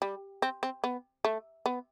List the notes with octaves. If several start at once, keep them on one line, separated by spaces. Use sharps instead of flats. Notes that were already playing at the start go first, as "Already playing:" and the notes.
G3
C4
C4
B3
A3
B3